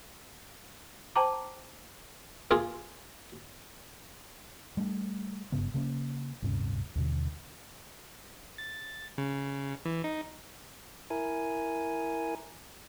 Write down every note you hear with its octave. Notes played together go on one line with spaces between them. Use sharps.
C5 G5 A5 A#5 D6
A#3 F4 G#4
G3 A3 D4
F#1 G2 C#3 B3
C#3 A#3 C#4
D1 G2 C3 C#4
D#2 B2 D3
A6
C#3
E3
D#4
E4 A#4 G#5